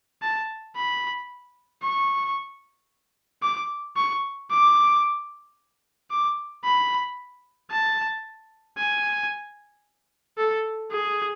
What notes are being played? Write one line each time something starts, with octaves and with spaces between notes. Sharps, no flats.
A5
B5
C#6
D6
C#6
D6
D6
B5
A5
G#5
A4
G#4